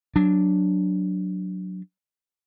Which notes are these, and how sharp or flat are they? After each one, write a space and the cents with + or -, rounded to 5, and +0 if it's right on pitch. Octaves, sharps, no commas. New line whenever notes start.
F#3 +0 D4 +0